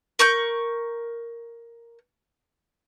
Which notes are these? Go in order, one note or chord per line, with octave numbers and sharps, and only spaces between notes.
A#4 C#6 G6